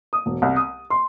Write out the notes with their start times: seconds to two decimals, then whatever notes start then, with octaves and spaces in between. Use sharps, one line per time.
0.13 D#6
0.26 E1
0.42 C2
0.56 D#6
0.90 C6